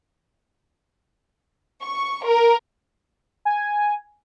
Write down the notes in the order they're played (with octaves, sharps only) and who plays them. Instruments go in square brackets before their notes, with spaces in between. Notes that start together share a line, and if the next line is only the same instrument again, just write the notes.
[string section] C#6
A#4
[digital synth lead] G#5